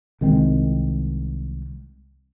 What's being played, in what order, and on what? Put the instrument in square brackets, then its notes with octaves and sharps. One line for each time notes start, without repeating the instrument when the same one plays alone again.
[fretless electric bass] C2 D#3 G#3 C4